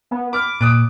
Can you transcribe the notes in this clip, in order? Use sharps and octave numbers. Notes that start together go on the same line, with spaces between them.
B3
B5 D6 F6
A#2 D#6 F#6 D7